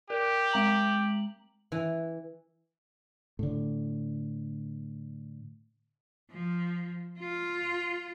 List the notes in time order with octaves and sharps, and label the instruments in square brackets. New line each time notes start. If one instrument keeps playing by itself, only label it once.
[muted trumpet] G4 [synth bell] A#4
[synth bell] G#3 A#5 F#7
[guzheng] E3
[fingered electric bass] A2 D3
[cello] F3
F4